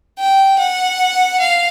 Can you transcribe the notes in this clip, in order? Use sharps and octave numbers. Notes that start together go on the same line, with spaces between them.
G5
F#5
F5